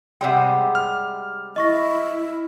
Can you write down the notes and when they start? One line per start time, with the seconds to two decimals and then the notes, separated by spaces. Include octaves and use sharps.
0.21 C3 G3 G#3 F#5 G5
0.75 F6
1.56 E4 D#5 C#6 A#6